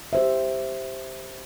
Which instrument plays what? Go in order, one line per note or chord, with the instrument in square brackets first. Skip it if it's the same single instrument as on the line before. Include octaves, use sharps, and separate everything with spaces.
[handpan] G4 C5 E5